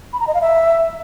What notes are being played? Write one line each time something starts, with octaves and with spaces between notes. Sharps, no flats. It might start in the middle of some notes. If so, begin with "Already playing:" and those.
B5
A#5
D#5
F5
E5